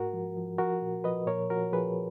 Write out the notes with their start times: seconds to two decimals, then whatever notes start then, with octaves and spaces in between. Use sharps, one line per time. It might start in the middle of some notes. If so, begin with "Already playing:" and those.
Already playing: G#2 F#4 A#4
0.13 F3
0.37 F3
0.58 F3 F#4 A#4
0.82 A#2
1.04 F3 B4 D#5
1.27 A#2 A#4 C#5
1.50 F3 F#4 A#4
1.72 F3 G#4 B4